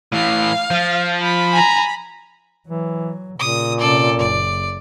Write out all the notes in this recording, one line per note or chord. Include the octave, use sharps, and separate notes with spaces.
A2 E3 F5
F3
B5
G#5 A#5
E3 F#3
A#2 C#3 D#6
C3 C#4 A4 D5
F#1 D5